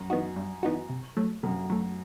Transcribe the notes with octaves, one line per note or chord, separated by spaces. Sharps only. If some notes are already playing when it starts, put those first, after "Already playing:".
Already playing: F#2
E3 B3 D#4 F#4
G2
E3 B3 D#4 F#4
C3
F#3 A3
F#2 C3
F#3 A3